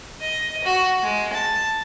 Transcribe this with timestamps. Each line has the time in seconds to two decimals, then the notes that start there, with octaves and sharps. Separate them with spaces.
0.21 D#5
0.64 F#4
1.03 G#3
1.33 A5